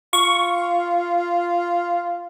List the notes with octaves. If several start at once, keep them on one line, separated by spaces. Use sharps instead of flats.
F4 C#6